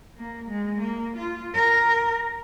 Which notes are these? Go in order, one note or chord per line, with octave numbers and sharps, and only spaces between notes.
A#3
G#3
A#3
F4
A#4